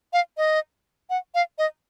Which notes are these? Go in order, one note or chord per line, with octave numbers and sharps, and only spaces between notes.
F5
D#5
F#5
F5
D#5